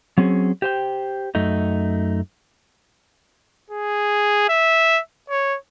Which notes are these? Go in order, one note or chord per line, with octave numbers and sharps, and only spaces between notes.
F#3 C4 C#4 G#4
G4 C5 G5
F#2 A3 D#4
G#4
E5
C#5